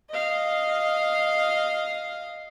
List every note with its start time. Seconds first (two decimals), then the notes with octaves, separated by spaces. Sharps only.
0.10 D#5 F5